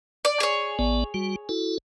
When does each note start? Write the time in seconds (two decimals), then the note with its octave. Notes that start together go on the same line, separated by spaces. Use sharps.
0.25 D5
0.40 G#4 C#5
0.79 A1 B3 D5
1.14 G3 F#4
1.49 E4 F#4 A4